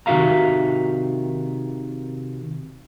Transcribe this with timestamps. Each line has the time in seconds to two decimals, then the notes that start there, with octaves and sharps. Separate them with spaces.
0.06 C3 D#3 F#4 E5 F5 A#5